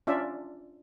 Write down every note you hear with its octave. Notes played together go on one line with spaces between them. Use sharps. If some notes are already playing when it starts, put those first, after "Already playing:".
C#4 D4 F4 D5 E5